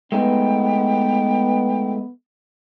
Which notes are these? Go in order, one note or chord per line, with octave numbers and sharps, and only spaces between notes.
G#3 A3 B3 D#4 G5